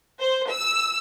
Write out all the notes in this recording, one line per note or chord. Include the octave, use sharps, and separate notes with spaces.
C5
E6